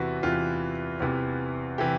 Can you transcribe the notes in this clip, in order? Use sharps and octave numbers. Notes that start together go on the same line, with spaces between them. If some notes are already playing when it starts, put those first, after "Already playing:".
Already playing: E2 C3 E3 F#4 B4
E2 C3 E3 F4
E2 C3 E3
C3 E3 G4